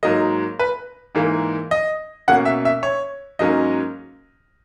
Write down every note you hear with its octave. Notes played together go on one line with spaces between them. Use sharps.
G#2 F#3 A#3 D#5
B4
G#2 E3 A#3
D#5
B2 A#3 C#4 F#5
E5
E5
C#5
G#2 F#3 A#3 C#4 D#5